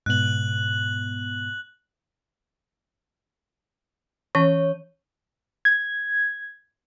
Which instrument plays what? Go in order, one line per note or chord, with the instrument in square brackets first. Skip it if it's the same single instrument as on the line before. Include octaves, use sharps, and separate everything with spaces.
[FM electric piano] G#2 B2 B3 [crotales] F#6 F#7
[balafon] E3 C#4 [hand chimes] C#5
[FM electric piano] G#6